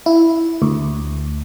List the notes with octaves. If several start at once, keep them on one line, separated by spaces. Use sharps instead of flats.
E4
D2